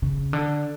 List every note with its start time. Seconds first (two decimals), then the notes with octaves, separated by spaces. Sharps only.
0.02 C#3
0.33 D3